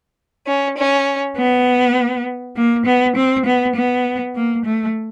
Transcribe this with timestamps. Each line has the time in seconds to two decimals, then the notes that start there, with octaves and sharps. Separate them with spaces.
0.47 C#4
0.77 C#4
1.37 B3
2.56 A#3
2.86 B3
3.16 C4
3.46 B3
3.76 B3
4.35 A#3
4.65 A3